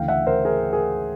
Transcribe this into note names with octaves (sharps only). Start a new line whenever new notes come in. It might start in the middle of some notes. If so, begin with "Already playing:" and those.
Already playing: D2 C#3 E3 F5 G5
E5 F#5
A#4 C5
G#4 A#4
G#4 A#4